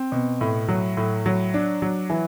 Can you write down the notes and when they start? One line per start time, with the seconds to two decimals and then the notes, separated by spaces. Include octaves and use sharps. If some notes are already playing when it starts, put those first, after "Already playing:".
Already playing: C4
0.12 B2
0.41 A2
0.68 F#3
0.97 A2
1.26 F#3
1.54 D4
1.82 F#3
2.10 E3